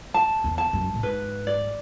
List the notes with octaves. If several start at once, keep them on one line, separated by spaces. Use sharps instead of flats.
A5
E2
A5
F#2
A2
G#2 B4
D5